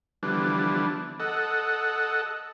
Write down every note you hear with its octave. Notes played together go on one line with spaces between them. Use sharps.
D3 E3 F3 G3 B3 D4
A4 D#5 F#5